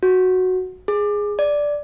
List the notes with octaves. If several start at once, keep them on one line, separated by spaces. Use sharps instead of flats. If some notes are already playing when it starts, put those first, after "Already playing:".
F#4
G#4
D5